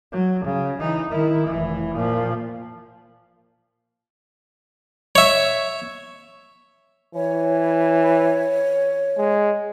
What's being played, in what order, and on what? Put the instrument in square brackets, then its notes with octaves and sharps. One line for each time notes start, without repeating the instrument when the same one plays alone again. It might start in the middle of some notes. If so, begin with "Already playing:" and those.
[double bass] F#3
C#3
E3 D#4
D#3 E4
F1 E3
A#2 F3
[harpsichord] C#5 E5
[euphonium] E3 [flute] C#5
[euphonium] G#3